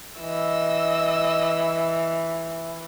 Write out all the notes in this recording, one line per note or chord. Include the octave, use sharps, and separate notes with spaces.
E3 D#5 E6